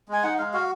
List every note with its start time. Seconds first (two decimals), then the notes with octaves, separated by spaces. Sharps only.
0.08 G#3 G#5
0.23 D#4 F#5
0.38 G#3 F5
0.53 F#4 F5